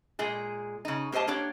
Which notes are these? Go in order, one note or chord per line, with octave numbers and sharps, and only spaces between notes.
A#2 G#3 G#4
C#3 D#4
A#3 G4 C5 D#5 A5
A#3 D4 G4 C#5 D5